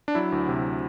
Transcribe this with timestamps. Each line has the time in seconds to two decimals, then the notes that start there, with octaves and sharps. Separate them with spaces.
0.08 D4
0.15 F#3 E4
0.32 D2
0.48 C3